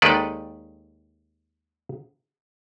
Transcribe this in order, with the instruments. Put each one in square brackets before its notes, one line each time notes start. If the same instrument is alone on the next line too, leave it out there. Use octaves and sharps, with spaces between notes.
[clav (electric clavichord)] D#2 D#3 G#3 A4 B4 D5